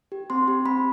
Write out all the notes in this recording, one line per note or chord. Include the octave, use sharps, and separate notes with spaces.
G4
C4 C6
G4
C4 B5